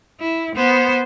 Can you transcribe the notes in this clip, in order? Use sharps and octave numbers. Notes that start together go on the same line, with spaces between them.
E4
B3 C5